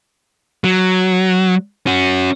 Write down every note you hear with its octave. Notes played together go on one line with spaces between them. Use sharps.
F#3
C#4 F#4